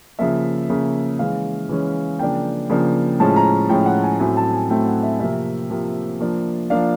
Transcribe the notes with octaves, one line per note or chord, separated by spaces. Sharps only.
C#3 F3 A#3 E5
C#3 F3 A#3
E3 G#3 C#4 F5
E3 G#3 C#4
C#3 F3 A#3 D4 G5
C#3 F3 A#3 D4
A2 F3 G#3 C#4 A5
A#5
A2 F3 G#3 C#4 G5
F#5
G#5
A2 F#3 A3 C4 G#5
A5
G#5
A2 F#3 A3 C4 G5
F#5
E5
C3 F3 A#3 E5
C3 F3 A#3
F3 A#3 D4
F3 A#3 D4 F5